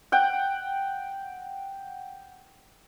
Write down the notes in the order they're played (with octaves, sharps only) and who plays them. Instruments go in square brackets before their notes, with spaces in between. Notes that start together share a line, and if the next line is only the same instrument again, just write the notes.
[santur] F#5 G5